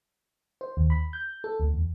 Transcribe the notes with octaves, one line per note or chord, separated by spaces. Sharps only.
C5
D#2
B5
G6
A4
D2
E2